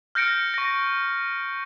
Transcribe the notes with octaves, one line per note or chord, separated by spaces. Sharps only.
F6 G6 A#6 C#7 D7
C#6 A#6